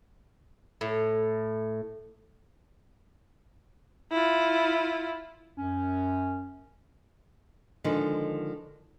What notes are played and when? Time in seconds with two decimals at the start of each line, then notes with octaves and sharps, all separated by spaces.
0.81 A2
4.12 E4 F4
5.58 F#2 C#4
7.84 D3 D#3 F3 G#3